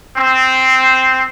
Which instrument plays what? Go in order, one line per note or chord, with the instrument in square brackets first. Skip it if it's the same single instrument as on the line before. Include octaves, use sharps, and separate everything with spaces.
[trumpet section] C4